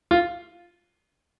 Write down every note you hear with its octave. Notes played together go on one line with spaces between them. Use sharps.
F4